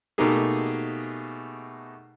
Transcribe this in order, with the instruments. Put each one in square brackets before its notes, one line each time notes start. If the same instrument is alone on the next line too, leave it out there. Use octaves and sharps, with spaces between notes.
[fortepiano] B2 A3 A#3 D#4 G4 G#4